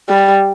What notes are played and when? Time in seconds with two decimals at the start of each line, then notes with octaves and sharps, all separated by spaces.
0.09 G3